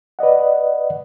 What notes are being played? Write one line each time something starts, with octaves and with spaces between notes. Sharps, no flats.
B4 D5 D#5 F#5